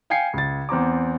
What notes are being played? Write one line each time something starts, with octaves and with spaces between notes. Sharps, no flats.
F5 G5 G#5 G#6 C7 C#7
C#2 A6
E2 C4 A#5 D6